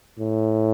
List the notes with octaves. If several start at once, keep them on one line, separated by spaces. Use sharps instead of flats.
A2